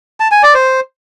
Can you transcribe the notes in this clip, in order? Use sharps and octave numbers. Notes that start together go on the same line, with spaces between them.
A5
G#5
D5
C5